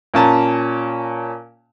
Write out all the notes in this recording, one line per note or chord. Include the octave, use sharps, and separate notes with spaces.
A#2 C#4 A5 A#5